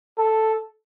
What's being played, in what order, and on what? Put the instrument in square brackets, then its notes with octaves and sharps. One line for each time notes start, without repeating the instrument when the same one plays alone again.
[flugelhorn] A4